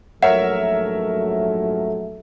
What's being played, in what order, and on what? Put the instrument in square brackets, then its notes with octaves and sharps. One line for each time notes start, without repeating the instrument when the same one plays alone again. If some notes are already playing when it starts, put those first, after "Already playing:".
[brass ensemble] A#1 G#2 F#3 [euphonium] A3 [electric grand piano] A#4 C#5 E5 [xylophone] F#5